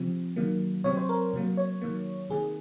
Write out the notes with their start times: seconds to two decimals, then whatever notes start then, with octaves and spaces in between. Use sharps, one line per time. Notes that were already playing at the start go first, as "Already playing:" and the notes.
Already playing: C3 F3 C4
0.36 D#3 F#3 A#3
0.84 C3 F#3 C4 C#5
0.97 C5
1.09 A#4
1.33 C3 F#3 A#3
1.57 C#5
1.81 D#3 F#3 A#3
2.29 C3 D#3 A#3 G#4